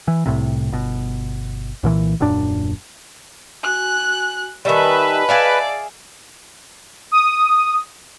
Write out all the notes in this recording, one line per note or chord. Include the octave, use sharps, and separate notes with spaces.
E3
C2 A2 C3
G1 B2
C2 A#2 E3
D#1 F#2 A#2 D4
F#4 G#5 F#6
D#3 G3 B4 D#5 E5 G#5 A5
G#4 D5 E5 F5
D#6